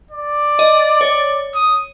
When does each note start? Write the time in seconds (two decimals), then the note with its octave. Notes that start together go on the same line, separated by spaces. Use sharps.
0.11 D5
0.59 D#5
1.01 C#5
1.55 D#6